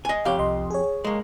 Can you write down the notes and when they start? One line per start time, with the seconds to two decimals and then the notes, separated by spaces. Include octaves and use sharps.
0.05 D#5 G#5
0.25 F2 G4 C#5 F5
0.38 C2 D#5 C6
0.71 G#4 C#5
1.04 G#3 A#3